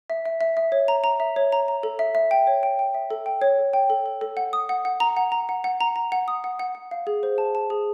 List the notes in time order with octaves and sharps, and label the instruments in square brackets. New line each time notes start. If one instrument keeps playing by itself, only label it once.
[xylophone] E5
E5
E5
E5
C#5
A#5
A#5
E5
C#5
A#5
A#5
A4
E5
E5
G5
C#5
G5
G5
E5
A4
G5
C#5
A4
G5
A4
A4
A4
F#5
D#6
F#5
F#5
A#5
F#5
A#5
F#5
F#5
A#5
A#5
F#5
D#6
F#5
F#5
F#5
F5
G#4
C5
A5
A5
G#4